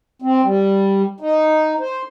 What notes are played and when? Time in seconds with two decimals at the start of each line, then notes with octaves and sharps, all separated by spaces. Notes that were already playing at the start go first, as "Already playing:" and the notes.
0.22 C4
0.43 G3
1.20 D#4
1.80 C5